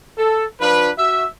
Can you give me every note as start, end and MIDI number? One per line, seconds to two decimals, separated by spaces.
0.18 0.46 69
0.61 0.91 53
0.61 0.91 62
0.61 0.91 65
0.61 0.91 71
0.98 1.25 66
0.98 1.25 76